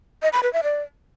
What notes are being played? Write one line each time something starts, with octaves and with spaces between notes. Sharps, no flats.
D#5
B5
B4
E5
D5